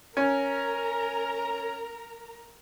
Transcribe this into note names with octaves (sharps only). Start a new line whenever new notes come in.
C#4 A#4 A#5